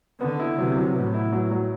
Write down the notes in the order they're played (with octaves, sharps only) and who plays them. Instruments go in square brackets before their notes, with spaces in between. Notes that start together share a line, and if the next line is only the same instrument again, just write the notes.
[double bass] D3 [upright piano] B3
[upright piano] E4
[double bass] C3 [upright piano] F#3
[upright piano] F#3
[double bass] A2 [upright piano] B3
[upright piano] E4
F#3
F#3